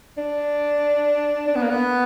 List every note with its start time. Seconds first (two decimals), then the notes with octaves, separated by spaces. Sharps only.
0.18 D4
1.48 D4
1.55 B3
1.62 A#3
1.70 B3